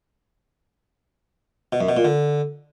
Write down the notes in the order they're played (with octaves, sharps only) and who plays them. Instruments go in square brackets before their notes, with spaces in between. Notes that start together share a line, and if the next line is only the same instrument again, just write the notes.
[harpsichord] B2
F#2
B2
A#2
D3